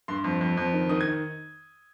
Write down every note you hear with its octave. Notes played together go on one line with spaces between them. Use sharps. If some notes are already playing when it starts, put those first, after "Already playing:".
G2 C6
F2
F2
F2
D#3
D#3 D#6
G#6
D#3